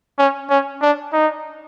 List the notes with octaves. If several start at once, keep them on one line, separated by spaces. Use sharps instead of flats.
C#4
C#4
D4
D#4